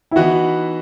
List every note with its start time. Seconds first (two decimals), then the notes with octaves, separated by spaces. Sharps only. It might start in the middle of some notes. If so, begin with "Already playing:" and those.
0.11 E4
0.16 E3 B3 D#4 F#4